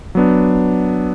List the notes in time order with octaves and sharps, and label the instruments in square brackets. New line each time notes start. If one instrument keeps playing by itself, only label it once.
[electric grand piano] F#3 B3 D4